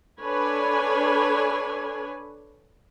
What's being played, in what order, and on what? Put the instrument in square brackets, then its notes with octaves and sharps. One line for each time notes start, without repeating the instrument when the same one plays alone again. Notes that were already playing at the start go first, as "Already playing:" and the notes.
[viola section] D4 A4 B4 C#5 G#5